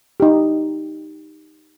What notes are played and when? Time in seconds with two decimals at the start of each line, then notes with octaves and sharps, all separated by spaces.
0.20 D#4 G4